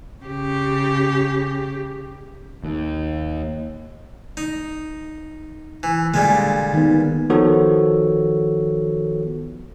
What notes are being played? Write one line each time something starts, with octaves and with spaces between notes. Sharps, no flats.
C#3 G4
D#2
D#4
E3
A#2 D3 G3 G#3 A#3
D#3 B3
D#3 F3 B3 F#4 A4 C#5